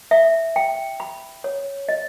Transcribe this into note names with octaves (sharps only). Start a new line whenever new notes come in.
E5
G5
B5
C#5
D#5